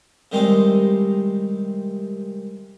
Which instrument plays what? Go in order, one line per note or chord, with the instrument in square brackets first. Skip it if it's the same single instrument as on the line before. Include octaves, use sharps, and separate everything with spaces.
[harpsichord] C3 D#3 G3 G#3 C4 D#4